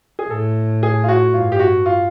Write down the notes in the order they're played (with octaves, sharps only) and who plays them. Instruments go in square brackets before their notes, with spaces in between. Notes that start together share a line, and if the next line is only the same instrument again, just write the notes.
[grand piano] G#4
[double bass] A2 [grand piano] A4
[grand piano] G#4
F4
F#4
[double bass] G2 [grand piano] F4
[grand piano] G4
F#4
F4